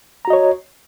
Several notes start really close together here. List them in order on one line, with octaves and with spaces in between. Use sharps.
A#5 F#4 D#5 C#5